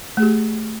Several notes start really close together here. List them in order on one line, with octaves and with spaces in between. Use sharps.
A3 G#4 G4